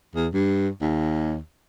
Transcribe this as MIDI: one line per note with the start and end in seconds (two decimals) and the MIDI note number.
0.15 0.28 40
0.33 0.69 43
0.81 1.37 39